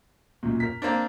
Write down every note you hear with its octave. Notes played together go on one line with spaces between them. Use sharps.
B1 F#2 A#2
A#4 B6
A#3 C4 D4